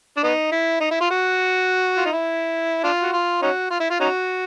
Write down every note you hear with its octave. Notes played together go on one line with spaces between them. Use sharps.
D4
B3 D#4
E4
D#4
E4
F4
F#4
F4
D#4
E4
D4 F4
F#4
F4
C#4 D#4 F#4
F4
E4
F4
C#4 D#4 F#4